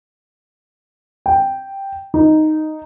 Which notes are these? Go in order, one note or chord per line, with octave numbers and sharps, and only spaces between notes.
G5
D#4